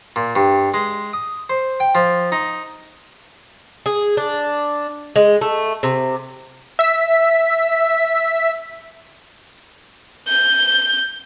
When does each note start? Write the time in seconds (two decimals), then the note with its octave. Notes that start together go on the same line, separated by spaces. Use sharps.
0.16 A#2
0.36 G2
0.74 G#3
1.13 D#6
1.50 C5
1.80 G5
1.95 F3
2.32 D#4
3.86 G#4
4.17 D4
5.16 G#3
5.41 A3
5.83 C3
6.79 E5 B6
10.28 G6